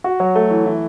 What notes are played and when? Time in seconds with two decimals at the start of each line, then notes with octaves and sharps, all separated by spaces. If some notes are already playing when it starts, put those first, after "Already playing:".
0.04 F#4
0.20 F#3
0.36 A3
0.51 E3
0.66 E3